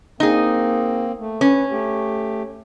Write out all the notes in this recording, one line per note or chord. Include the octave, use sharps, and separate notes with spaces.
A#3 C4 D#4 G#4
A3
C#4 B4
A3 G4